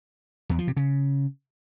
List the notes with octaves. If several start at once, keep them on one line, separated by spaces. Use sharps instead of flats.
E2
F3
C3
C#3